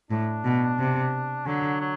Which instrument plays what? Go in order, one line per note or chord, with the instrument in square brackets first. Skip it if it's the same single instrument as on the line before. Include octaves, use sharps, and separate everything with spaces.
[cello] A2 [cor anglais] D4
[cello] B2
C3
[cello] D3 [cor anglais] F#3
[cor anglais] F#3